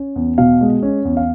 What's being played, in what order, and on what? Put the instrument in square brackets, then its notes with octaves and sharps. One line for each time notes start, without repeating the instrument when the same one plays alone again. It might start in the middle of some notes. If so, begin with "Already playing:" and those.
Already playing: [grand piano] C#4
E2
B2 F5
G#3
C#4
E2
F5